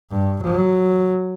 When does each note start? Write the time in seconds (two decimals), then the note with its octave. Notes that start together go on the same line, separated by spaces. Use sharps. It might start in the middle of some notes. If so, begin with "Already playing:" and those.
0.12 G2
0.43 F#3